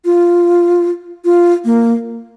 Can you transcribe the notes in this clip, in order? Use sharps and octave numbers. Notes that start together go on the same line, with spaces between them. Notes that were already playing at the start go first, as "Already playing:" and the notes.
F4
F4
A#3